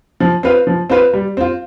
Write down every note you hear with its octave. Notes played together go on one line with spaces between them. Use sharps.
F3
C4 F4 B4 F5
F3
C4 F4 B4 F5
G3
C4 F4